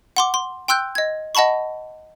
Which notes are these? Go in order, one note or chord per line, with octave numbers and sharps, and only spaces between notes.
F#5 C6 D6
C6
G5 C6 E6 F#6 G6
D#5 G#6
D#5 F#5 A5 B5 C#6